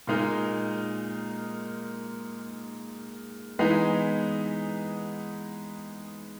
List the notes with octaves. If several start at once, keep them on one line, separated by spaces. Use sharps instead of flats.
A#2 G#3 D#4 A#4
E3 G#3 B3 D#4